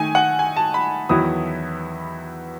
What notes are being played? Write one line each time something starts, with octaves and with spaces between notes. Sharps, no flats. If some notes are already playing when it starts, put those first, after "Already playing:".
Already playing: D#3 A3 D#4 G#5
F#5
G#5
A5
B5
E2 D#3 F#3 B3 E4 D#6